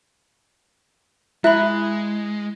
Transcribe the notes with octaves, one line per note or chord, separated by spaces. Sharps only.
G#3 E4 E5 B5 F#6